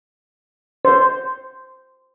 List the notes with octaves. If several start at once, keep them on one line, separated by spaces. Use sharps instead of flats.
C5